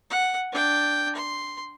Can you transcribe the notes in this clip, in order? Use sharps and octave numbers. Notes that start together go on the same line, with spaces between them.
F#5
D4 G5
C6